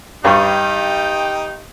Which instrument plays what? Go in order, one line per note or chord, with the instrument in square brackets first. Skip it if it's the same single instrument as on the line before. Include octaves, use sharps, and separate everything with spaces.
[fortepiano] G2 G3 C#5 [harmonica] D#4 G4